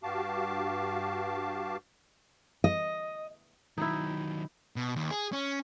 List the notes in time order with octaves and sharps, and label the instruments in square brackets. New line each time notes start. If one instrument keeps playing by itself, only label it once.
[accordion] G2 F#4 G4 F5 A5 D6
[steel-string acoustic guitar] D#5
[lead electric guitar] D#3 F#3 [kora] D#4 E4
[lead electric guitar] B2
D#2
G#4
C#4